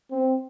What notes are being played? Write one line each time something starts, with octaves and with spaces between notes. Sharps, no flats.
C4